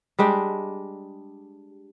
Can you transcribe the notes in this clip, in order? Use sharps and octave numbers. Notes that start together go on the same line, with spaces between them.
G3 G#3 D4 G4